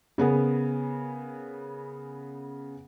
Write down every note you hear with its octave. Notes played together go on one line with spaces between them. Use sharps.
C#3 B3 G#4 A#4